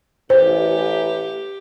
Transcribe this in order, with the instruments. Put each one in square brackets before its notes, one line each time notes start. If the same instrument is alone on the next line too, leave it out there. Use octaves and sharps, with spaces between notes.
[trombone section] A1 [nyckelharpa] G4 [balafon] C5